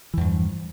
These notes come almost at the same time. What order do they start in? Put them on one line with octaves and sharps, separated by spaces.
E3 E2 G2 F3